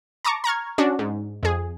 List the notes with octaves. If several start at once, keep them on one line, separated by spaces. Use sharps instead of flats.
A5 A#5 C#6 D6
A#5 C#6 F6 G#6
C#4 D4 F#4
G#2
F2 G#4